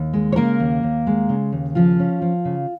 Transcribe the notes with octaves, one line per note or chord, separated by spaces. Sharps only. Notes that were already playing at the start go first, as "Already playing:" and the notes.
Already playing: D#2
G#3
C#5
C#3 A#3 A#4
D#2
D#2
G#3
C#3
D#2
C#3 F3 F4
C#4
F3
C#3